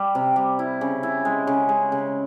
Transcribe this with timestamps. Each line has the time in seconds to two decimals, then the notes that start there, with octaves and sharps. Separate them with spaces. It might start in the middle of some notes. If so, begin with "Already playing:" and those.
Already playing: G3
0.15 C3
0.36 G3
0.59 E4
0.81 C#3
1.03 E4
1.25 G#3
1.47 C#3
1.69 G#3
1.92 C#3